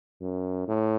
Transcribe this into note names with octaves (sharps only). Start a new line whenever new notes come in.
F#2
A2